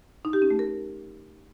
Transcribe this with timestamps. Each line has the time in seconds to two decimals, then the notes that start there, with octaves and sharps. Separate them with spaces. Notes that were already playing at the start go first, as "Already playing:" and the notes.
0.25 D#4
0.33 G4
0.42 C#4
0.50 A3
0.59 A#4